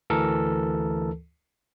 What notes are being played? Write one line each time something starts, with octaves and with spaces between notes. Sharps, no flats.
D2 E3 A4 A#4